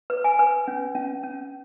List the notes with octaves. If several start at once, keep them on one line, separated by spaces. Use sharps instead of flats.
B4
G#5
B4
C#4
C#4
C#4